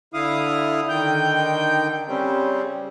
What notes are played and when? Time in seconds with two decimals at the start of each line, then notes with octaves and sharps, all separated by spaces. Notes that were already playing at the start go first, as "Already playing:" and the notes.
0.14 D3 E4 F5 D#6
0.89 D3 D#3 G5 G6
2.08 C#3 G3 C4